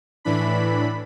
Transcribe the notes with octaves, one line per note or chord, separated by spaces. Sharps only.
A2 E3 D4 B5